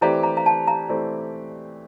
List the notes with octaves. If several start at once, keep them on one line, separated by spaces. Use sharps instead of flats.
E3 A3 C4 G4 D5 A#5
A#5
A#5
A5
A#5
E3 A3 C4 G4 D5